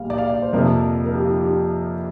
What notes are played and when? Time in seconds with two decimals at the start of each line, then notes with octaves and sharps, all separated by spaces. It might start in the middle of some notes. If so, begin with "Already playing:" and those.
Already playing: A#1 A#2 G3 F5
0.10 D5
0.18 F5
0.30 D5
0.42 C5
0.53 F2 C3 F3 A#3 A#4
1.05 A#4
1.15 G4
1.23 F4
1.42 G4